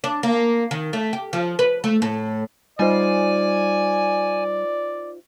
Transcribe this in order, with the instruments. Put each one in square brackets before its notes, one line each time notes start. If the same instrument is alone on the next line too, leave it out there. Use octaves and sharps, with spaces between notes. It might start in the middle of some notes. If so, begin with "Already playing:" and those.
[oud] D4
A#3
D#3
A3
G4
F3
B4
A3
A2
[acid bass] G3 [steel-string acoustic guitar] D#4 F4 C5 [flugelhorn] D5 [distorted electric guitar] G#5